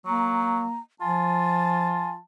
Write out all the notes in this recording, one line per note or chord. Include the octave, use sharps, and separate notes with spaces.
F#3 A#3 A#5
F3 F4 G#5 A5